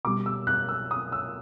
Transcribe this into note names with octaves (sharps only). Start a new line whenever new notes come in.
B2 G3 D6
E6
F#6
E6
D#6
E6